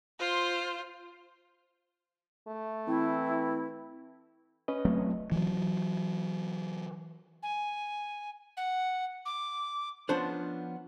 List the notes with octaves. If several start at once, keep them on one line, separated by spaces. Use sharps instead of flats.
F4 C5
A3
E3 C4 E4
C#4 B4 D#5
F#3 A3 C4
E3 F#3
G#5
F#5
D6
F3 B3 C#4 D4 C5